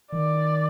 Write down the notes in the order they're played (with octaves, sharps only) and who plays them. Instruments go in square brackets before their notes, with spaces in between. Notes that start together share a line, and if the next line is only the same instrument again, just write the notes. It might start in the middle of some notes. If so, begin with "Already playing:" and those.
[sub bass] D#3 [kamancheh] D5